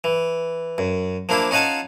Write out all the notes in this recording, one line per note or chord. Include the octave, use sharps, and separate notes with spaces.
E3
F#2
F3 A#3 D4 E4
C#4 D#4 F4 F#5 G#5 A5